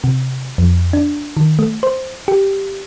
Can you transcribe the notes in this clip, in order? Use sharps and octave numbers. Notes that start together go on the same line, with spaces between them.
C3
F2
D4
D#3
A3
C5
G4